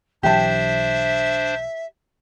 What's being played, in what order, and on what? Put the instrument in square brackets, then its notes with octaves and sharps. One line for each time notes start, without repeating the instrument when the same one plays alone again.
[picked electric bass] B1 E3 F#3 [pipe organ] D4 C5 [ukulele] G4 A5 [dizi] E5